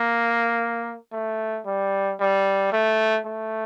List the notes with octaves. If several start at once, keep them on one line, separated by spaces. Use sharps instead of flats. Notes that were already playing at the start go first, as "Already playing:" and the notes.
Already playing: A#3
A3
G3
G3
A3
A3